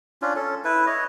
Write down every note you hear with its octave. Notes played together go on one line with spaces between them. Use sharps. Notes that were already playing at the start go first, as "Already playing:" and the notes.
C#4 D4 F4
C#4 A4
E4 B4
C#5 D#5